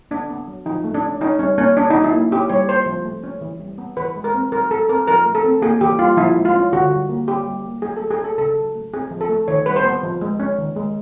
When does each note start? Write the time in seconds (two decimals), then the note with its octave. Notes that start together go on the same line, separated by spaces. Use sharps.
0.11 B3 D4
0.30 B3
0.48 F#3
0.66 F3 D#4
0.84 A3
0.94 D4
1.04 C#4
1.21 C#4 D#4
1.39 G3 C#4
1.58 A#3 C#4
1.76 C#4 D4
1.90 D#4
1.95 F#3
2.04 E4
2.13 A#3
2.31 C#4 G4
2.50 G3 C#5
2.68 A#3 C5
2.86 F3
3.05 A3
3.24 C#4
3.41 E3
3.60 G3
3.78 B3
3.97 E3 B4
4.16 G#3
4.24 A#4
4.34 C4
4.52 F#3 A#4
4.71 A3 A4
4.89 C4 A#4
5.08 F3 A#4
5.26 A3
5.35 A4
5.44 C4
5.62 A#3 G#4
5.81 E3 G4
5.99 G3 F4
6.17 F3 E4
6.36 G#3
6.45 F4
6.55 C#4
6.72 D3 F#4
6.91 G3
7.09 A#3
7.27 C#4 G4
7.47 G3
7.65 A#3
7.82 F#3 G#4
7.97 A4
8.01 A3
8.11 G#4
8.20 C#4 A4
8.38 C#3 A4
8.57 F#3
8.74 A3
8.94 C4 G#4
9.11 F3
9.21 A4
9.29 A3
9.48 D#3 C#5
9.66 G3 B4
9.76 C5
9.85 B3
10.03 F3
10.21 G#3
10.40 C#4
10.58 D#3
10.76 G#3